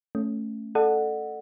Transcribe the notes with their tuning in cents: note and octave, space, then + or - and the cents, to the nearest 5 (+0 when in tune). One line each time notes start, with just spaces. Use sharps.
A3 +0 C#4 +0
A4 +0 D5 +40 F#5 -5